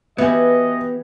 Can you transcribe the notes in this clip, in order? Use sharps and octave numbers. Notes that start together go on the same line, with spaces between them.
E3 B3 F#4 G4 D#5 E5 G#5